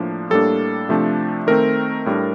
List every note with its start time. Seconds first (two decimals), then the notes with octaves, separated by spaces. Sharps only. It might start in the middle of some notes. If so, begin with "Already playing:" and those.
Already playing: A2 F3 A#3 D4
0.30 A2 G3 A#3 D4 A4
0.89 C3 F3 A3 D4
1.47 D#3 A3 C4 A#4
2.06 A2 G3 D4